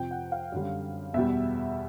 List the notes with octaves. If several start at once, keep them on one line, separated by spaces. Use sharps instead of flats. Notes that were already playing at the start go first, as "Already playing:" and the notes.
Already playing: F2 C3 F3 G5
F#5
F5
F#2 D3 G3
E2 B2 G3 E5